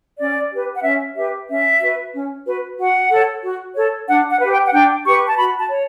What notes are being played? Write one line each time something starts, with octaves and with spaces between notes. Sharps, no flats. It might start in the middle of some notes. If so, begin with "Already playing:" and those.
C#4 D5
G4 B4
F#5
C#4 E5
G4 B4 E5
C#4 E5
F#4 B4
C#4
F#4 B4
F#4 F#5
A4 C#5
F#4
A4 C#5
D4 F#5
F#5
G4 B4
G5
F#5
D4 G5
G4 B4 C#6
A5
F#4 B5
A5
C#5